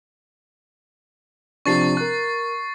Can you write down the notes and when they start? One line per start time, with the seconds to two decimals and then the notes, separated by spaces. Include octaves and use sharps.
1.66 C3 F3 D4 C#6 A6 C7
1.97 A#4 F#6